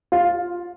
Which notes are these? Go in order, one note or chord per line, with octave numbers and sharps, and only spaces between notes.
F4